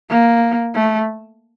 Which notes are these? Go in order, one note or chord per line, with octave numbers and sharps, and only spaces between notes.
A#3
A3